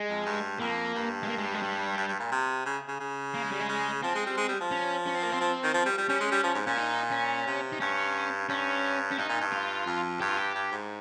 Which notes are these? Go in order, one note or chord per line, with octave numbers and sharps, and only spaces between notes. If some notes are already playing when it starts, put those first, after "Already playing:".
Already playing: G#3
F2
G2
F2 A#3
G2
G#3
A#3
G#3
G3
G#3
G3
G2
G2
A#2
C3
C#3
C#3
C#3
A#3
G#3
G3
G#3
C#3
F3 C4
G#3
G3
G#3
G3
F3
C#4
C#4
C4
A#3
C4
F3
D#3
F3
G3
G3
G3 C#4
G#3
G3
F3
G#2
A#2 C#4
D#4
C#4
C3
D#4
G2 C#4
G2 C#4
C#4
G2 D#4
A#2
G2
F4
F2
G2 G4
F4
G4
G2
G#2